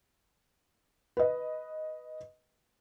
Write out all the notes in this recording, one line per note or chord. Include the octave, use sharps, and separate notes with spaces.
B4 D#5